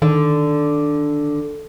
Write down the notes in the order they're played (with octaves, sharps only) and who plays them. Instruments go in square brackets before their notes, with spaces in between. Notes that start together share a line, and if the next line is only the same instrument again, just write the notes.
[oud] D3 [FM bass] D#3